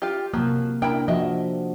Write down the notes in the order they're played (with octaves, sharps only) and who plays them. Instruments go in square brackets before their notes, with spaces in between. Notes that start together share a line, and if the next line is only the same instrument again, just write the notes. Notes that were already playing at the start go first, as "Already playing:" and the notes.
[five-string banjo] F4 G4
[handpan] C3 A#3 [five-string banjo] F3 F#3
[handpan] D4 [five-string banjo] E4 A#4 G5
[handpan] F3 F#4 [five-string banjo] D#5 E5